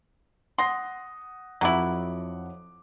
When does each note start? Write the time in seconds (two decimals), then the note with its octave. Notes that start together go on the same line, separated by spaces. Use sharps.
0.58 F#5 C6 D#6 A#6
1.61 F2 F#3 E4 F#5 D6